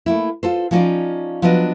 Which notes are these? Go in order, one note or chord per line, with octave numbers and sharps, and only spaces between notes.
A3 A#3 E4
F4 A4 C5
F3 C#4 D#4 F4 D5
F3 F#3 B3 D4 F4 D#5